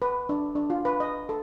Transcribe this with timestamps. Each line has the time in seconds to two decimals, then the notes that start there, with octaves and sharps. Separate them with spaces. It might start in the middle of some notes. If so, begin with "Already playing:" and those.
0.02 B4
0.29 D4
0.55 D4
0.70 F4
0.85 B4
1.00 D#5
1.29 A4